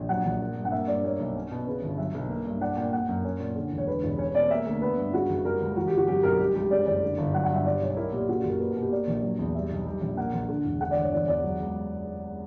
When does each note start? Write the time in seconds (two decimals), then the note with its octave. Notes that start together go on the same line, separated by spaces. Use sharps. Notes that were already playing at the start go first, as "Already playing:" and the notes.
Already playing: A#1
0.09 F#3 F#5
0.25 A#1
0.41 A#3
0.56 G2
0.65 F#5
0.72 A#3 E5
0.88 G2 D5
1.04 A#3 C#5
1.19 B1
1.36 C#4
1.51 B2
1.67 C#3 B4
1.82 G1
1.98 F#3 E5
2.14 B1
2.29 A#3
2.46 G2
2.61 D4 F#5
2.77 A#2 G5
2.93 A#3 F#5
3.09 F#2
3.24 C#4 C#5
3.40 A#2
3.56 D3
3.71 E1
3.78 C#5
3.87 D3 B4
4.04 E1
4.18 C#4 C#5
4.35 B2 D5
4.51 A#3 E5
4.66 D2
4.82 B3 B4
4.97 G2
5.13 C#3 F#4
5.29 F#1
5.45 G3 A#4
5.61 C#2
5.76 E3 F#4
5.87 G1 G4
5.97 F#4
6.08 F#3 G4
6.23 B1 A#4
6.39 G3 G4
6.55 C#2 G4
6.71 C#3 D5
6.86 F#1 D5
7.02 D3
7.18 G1
7.33 F#3 F#5
7.44 F#5
7.50 G2 E5
7.65 G3 D5
7.81 B1 C#5
7.97 E4 A#4
8.12 A#2 G4
8.28 C#3 F#4
8.40 F#1 G4
8.49 A#4
8.60 A#3 B4
8.71 A#4
8.76 B2 G4
8.91 A#3 D5
9.07 A#1 D5
9.23 F#3
9.39 E2
9.55 G3 E5
9.70 B1
9.86 G3
10.01 A#1
10.17 A#3 F#5
10.33 A#1
10.49 D3
10.65 E1
10.81 D3 F#5
10.91 D5
10.97 G1 C#5
11.13 E3 D5
11.28 E2 D5
11.43 F#3
11.60 C#2